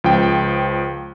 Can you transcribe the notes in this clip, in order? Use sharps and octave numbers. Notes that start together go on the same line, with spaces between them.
C#2 F3 G5